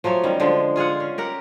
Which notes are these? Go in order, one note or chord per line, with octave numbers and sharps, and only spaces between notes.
F3 F#3 A3 C#5
D#3 G3 C#4
D3 F3 G#3
F4 G#4 F5 F#5
C#4
G4 A#4 F#5